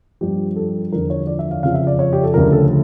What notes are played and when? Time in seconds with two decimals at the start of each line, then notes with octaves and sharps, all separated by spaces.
0.21 G2 F3 G4
0.56 A4
0.92 E2 D3 F3 A#4
1.10 C#5
1.27 D5
1.39 E5
1.51 F5
1.63 F2 C#3 F3 F5
1.74 E5
1.87 D5
1.99 C#5
2.13 G4
2.23 A4
2.33 D2 C#3 F3 A#4
2.52 A4